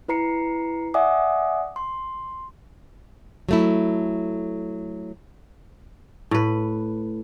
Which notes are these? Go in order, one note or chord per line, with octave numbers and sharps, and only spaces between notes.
E4 B4 A#5 C7 C#7
D5 E5 F#5 G#5 D6 D#6
C6
F#3 A3 E4
A2 B4